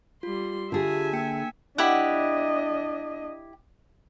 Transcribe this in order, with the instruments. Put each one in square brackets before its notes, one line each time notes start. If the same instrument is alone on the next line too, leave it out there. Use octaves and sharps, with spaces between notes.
[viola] G3 C6 [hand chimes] F4
[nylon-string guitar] D3 G#4 [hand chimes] F4 G4 [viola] E5 G#5
[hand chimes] A#3 G5 C#7
[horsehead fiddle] D4 D#5 [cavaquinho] E4 G4 F#5